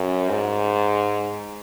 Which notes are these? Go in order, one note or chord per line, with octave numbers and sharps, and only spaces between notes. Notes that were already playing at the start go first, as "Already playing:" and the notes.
Already playing: F#2
G#2